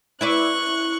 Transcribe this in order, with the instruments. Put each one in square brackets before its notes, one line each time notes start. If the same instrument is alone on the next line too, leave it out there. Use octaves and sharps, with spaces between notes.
[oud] E4 B4 D5 [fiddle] C#6 F#6